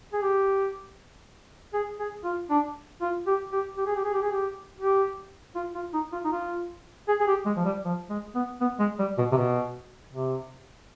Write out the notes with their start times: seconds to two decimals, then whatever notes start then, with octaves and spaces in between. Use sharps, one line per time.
0.13 G#4
0.22 G4
1.74 G#4
1.99 G#4
2.24 F4
2.50 D4
3.01 F4
3.27 G4
3.52 G4
3.77 G4
3.86 G#4
3.96 G4
4.04 G#4
4.14 G4
4.22 G#4
4.32 G4
4.79 G4
5.55 F4
5.75 F4
5.94 D#4
6.12 F4
6.24 D#4
6.32 F4
7.08 G#4
7.20 G#4
7.28 G4
7.46 G#3
7.56 F3
7.65 G3
7.85 F3
8.10 G#3
8.35 B3
8.61 B3
8.79 G#3
8.99 G3
9.18 B2
9.32 C3
9.37 B2
10.13 C3